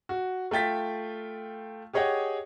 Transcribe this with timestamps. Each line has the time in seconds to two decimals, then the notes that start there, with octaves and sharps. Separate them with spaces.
0.09 F#4
0.51 A3 F4 G5 A6 B6
1.93 G4 G#4 C#5 D#5 F#5 G5